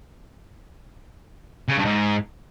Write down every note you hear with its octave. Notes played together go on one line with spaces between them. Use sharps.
C#3
G2
G#2